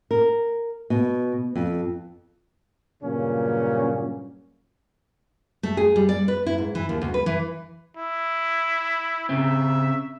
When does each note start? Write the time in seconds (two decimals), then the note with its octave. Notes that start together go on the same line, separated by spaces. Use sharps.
0.11 A#4
0.90 B2
1.56 F2
3.03 G2 A#2 C#3 F#3 C#4
5.63 A3
5.77 G#4
5.96 G3
6.09 D5
6.28 B4
6.46 E4
6.58 G#2
6.75 E3
6.89 D#2
7.02 D2
7.14 B4
7.26 E3
7.97 E4
9.29 C#3 C4 E5